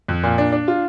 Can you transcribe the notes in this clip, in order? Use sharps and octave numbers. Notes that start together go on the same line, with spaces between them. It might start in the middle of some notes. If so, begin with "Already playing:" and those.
F2
A#2
D4
D4
F4